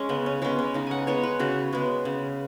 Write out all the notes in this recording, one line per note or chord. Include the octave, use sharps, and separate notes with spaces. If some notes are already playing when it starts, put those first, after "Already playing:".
Already playing: G#3 C#4
C#3 B3
C#4
G#3 B3 C#4
C#4
C#3 D#4
F#5 G#5
G#3 B3 C#5
B4
C#3 F#4
G#3 B3
C#3